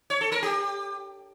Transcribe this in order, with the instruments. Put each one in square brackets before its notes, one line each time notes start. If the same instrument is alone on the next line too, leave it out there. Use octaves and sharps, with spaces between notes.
[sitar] C#5
A4
A#4
G4